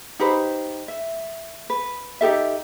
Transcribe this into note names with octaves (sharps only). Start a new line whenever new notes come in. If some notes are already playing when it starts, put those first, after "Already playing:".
D#4 G4 B4 C5
E5
B4
D#4 G4 A4 E5